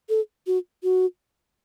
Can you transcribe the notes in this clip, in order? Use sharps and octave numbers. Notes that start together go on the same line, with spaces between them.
A4
F#4
F#4